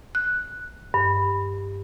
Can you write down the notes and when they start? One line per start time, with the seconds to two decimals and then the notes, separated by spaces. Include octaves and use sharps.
0.15 F#6
0.94 G2